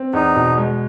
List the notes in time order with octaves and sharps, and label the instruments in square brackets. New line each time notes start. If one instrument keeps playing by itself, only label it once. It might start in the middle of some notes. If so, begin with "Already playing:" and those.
Already playing: [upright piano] C4
[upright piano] E2 [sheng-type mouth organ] D#4
[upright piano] B2
G#3